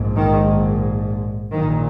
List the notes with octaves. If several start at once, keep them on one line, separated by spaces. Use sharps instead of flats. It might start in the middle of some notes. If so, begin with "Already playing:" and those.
Already playing: A#1 G#2
D#3
A#1 A#2 D#3